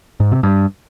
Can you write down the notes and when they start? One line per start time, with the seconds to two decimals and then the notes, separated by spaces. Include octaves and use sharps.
0.20 G#2
0.32 C3
0.43 G2